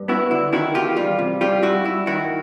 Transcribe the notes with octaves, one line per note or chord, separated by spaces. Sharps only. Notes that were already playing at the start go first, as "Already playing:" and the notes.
Already playing: G2
B3 E4 F#4
D3 E4
D#3 E4 F#4
E2 F4 G4
G3 F4
C3
G3 F4 G4
G2 E4 F#4
G2 E4
D#3 E4 F#4